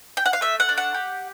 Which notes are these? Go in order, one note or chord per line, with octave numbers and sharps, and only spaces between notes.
G5
F#5
F5
A3 E5
F#5
D4
F#5
G4